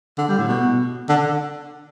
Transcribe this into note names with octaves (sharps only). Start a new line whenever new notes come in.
D3
G3
A2
B2
D3